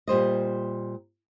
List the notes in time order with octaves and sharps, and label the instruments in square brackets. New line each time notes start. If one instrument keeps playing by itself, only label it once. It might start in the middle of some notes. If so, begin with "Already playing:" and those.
[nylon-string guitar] A#2 G3 C5 D#5